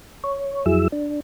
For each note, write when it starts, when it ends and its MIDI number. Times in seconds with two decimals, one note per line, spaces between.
0.24 0.65 73
0.66 0.88 41
0.66 0.88 54
0.66 0.88 64
0.66 0.88 68
0.66 0.88 88
0.92 1.20 62